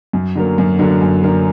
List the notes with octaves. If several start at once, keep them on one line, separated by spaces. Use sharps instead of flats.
F#2
D3 F#3 A#3
F#2
D3 F#3 A#3
F#2
D3 F#3 A#3